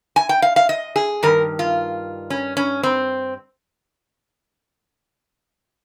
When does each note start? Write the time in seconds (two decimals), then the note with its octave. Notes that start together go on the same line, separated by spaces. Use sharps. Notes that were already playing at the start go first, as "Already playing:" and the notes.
0.16 G#5
0.29 G5
0.42 F5
0.56 F5
0.69 D#5
0.96 G#4
1.23 G2 D#3 A#4
1.59 F4
2.30 C#4
2.57 C#4
2.83 C4